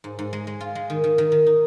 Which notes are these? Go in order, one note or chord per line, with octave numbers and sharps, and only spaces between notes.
G#2
G#2
G#3
G#3
F4
G#3
D#3
D#3
D#3
D#3
D#4